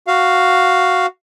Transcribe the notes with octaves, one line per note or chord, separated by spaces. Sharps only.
F#4 F5